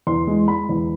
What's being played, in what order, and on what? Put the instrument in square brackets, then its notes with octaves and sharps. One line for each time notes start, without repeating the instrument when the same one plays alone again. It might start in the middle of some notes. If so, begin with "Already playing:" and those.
[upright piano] E2 C6
G#3
G#3 B5
E2